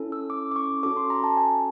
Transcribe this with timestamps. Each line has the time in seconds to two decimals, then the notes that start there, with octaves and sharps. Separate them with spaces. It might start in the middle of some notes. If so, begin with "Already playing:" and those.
Already playing: C#4 E4 A4
0.12 E6
0.30 D6
0.51 D6
0.56 C#6
0.83 C#4 F#4 A4 D6
0.97 C6
1.10 A#5
1.24 A5
1.37 G#5